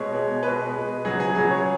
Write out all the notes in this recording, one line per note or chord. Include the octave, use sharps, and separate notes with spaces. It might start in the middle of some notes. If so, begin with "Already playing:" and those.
Already playing: B2 G#3 C#5
B2 G#3
B2 G#3 B4
B2 G#3
C#3 F#3 G#4
G#4
C#3 F#3 G#4
C#5